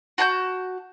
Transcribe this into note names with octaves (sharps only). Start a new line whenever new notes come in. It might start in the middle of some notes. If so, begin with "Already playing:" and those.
F#4 A5 A#5 G6